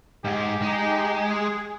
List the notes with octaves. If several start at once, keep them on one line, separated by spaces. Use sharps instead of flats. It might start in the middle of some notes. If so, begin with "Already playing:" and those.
G#2 G4 G#4
G#3 D#4
G#4